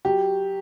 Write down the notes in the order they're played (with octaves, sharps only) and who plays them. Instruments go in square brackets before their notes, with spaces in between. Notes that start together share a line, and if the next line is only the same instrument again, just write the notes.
[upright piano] F#3 G4